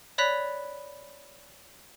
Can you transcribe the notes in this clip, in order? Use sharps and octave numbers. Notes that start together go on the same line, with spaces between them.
C#5 D5 B5 F#6 B6 F7